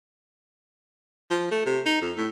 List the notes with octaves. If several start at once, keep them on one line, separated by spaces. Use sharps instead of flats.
F3
A3
C3
D#4
F2
A2